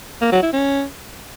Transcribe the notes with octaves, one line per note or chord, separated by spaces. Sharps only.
A#3
F#3
E4
C#4